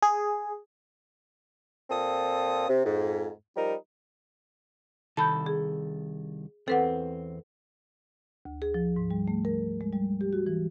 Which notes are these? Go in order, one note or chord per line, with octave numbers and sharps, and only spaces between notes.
G#4
A#2 C4 F4 A4 D#6
C3
F2 G#2
F3 G3 D#4 A#4
C2 D#3 A4 A5 B5 G6
G#4
E2 C4 A4 B4 F#5
D2
G#4
F3
G#2
G3
A3
A#4
G#3
G3
G4
F#4
E3